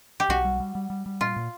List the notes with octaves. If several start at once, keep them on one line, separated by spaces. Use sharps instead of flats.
G4
B1 F#4
G3
G3
G3
G3
G3
A#2 F4
A#2